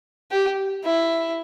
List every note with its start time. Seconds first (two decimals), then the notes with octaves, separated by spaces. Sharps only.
0.31 G4
0.84 E4